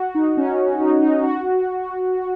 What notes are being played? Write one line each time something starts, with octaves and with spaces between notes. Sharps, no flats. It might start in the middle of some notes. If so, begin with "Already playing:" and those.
Already playing: F#4
D#4
C#4
C#4
D#4
D#4
F#4